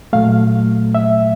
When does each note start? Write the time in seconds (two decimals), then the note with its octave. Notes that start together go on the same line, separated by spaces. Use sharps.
0.13 A#2 F#3 A3 F5
0.95 E5